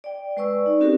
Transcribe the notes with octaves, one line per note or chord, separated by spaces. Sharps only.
D5 G5
G#3 B4 D5 C#6 E6
D#4
C4 C#4 F#4 G4 A4 A#4